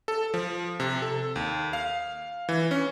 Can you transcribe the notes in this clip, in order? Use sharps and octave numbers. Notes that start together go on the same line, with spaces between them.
A4
F3
C3
A4
D#2
F5
E3
C#4